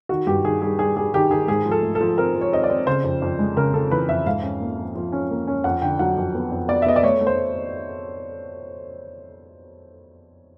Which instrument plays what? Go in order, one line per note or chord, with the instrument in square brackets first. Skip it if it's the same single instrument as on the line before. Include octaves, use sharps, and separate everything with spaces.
[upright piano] D#3 F#4
G2 G4
D#3 G#4
G3 G#4
G3 G#4
G3 G#4
D#3 G4
D#3 G#4
G#2 G#4
F3
A4
A3
A4
F3
C4 A#4
F3
C#5
C4 D#5
D5
C4
C#3 C5
F2
F2
G#3
C#3 A#4
C#3 A4
E3 B4
F2 E5
G#2 F5
C#4
A#3
F3
F3
C#4
A#3
C#4
F2 F#5
D3 G5
F#3 F#5
F2
B3
F2
B3 D5
E5
B3 D#5
D5
A3 C#5
A3
C5